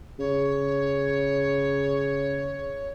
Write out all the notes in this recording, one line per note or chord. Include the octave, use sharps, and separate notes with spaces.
C#3 C#5